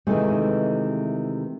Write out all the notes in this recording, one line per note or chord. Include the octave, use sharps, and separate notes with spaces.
C3 D#3 E3 G#3 A3